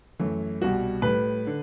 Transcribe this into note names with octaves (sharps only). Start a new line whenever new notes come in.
F#2 E3 A3
C2 B2 G3 F#4
A2 G3 B4
D3